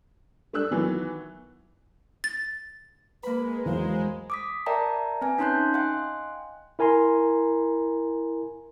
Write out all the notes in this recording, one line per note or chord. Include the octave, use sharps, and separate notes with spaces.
G3 A3 D4 E6 F#6
D#3 E3 F#3 B3
A6
G#3 A#3 B4 B5
E2 F#3 C5 F5
D6 D#6 B6
A#4 D5 E5 G5 A5 A#5
C4 B4 E5 G#5 G#6
C#4 D#4 A5 C6 F#6 G6
D#5 F5 G5 G#5 C6 F#6
E4 A#4 G#5 A#5 C6